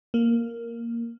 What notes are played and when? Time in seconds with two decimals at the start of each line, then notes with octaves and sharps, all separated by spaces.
0.14 A#3